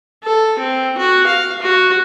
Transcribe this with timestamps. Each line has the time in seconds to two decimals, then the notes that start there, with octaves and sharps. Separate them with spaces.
0.24 A4
0.59 C4
0.98 F#4
1.26 F5
1.62 F#4